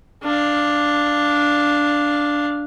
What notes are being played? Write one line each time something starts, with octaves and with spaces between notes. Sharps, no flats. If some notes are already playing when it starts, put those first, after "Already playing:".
D4 F5